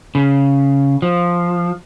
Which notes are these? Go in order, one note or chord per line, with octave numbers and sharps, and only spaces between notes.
C#3
F3